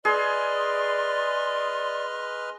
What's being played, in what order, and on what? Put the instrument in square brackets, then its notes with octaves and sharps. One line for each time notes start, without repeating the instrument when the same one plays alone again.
[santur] G#4 [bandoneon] B4 D#5 F6 [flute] D5 [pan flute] C6